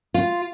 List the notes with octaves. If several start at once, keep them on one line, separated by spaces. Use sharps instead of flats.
F4